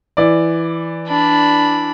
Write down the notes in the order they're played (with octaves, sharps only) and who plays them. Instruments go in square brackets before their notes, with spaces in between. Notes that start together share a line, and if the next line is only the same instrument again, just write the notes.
[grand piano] E3 D5
[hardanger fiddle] D4 B5